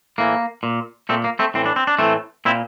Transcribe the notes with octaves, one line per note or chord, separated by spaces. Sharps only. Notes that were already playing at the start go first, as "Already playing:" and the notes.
A2 E3 A#3
A#2
A#2 A3 C4
A#3
A3 C4
A2 E3 C4
D4
C4
D4
A2 E3 A3 C4
A#2 C4 E4